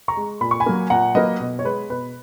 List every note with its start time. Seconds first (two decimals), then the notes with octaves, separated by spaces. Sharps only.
0.08 A#5 C#6
0.17 G#3
0.41 A#2 B5
0.51 C#6
0.60 G#5 B5
0.66 F#3 A#3
0.90 A#2 F#5 A#5
1.15 F#3 A#3 B4 D#5
1.40 B2
1.59 C#5
1.64 G#3 B4
1.90 B2 B4